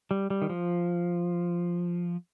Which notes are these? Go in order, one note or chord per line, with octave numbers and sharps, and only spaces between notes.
G3
G3
D#3
F3